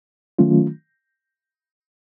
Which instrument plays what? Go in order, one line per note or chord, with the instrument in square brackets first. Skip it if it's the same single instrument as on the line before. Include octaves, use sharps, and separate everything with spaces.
[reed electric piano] D#3 F#3 A3 C#4 F4